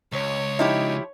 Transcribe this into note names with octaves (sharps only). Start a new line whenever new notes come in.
C#2 C#5
F3 D#4 E4 G4